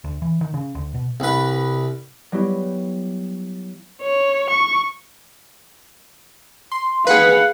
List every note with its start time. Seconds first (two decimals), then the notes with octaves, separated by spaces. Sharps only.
0.04 D2
0.22 E3
0.41 D#3
0.54 C#3
0.75 D2
0.94 B2
1.20 C2 B4
2.32 F#3 G3 B3 E4 G4
4.02 C#5
4.49 C#6
6.72 C6
7.07 G#4 B4 F5 F#5